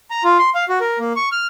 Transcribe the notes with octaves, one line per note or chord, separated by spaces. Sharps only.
A#5
F4
C6
F5
F#4
A#4
A#3
C#6
F6